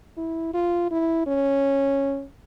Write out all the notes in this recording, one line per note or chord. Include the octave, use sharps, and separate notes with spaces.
E4
F4
E4
C#4